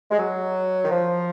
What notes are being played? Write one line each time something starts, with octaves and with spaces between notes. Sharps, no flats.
G#3
F#3
D#3
F3